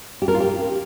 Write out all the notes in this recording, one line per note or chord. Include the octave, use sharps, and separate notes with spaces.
G4
A#4
F4
G4